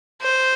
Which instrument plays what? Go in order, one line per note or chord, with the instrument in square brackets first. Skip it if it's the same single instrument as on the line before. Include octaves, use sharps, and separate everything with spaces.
[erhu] C5